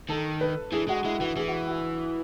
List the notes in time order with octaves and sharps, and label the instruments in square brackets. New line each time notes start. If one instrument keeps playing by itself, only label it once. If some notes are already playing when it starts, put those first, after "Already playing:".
[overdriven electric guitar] D#3 [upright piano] A4
[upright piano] B4
[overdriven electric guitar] E3 [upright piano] G#4
[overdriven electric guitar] G#3 [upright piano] F#4
[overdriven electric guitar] G#3 [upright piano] E4
[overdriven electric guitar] E3 [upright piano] F#4
[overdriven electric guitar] E3 [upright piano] G#4
[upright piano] F#4
E4
F#4